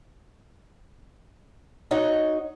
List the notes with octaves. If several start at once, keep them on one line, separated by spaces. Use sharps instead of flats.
D#4 F#4 C#5 D#5